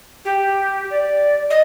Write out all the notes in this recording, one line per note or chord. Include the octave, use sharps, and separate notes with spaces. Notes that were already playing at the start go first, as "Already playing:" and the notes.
G4
D5
D#5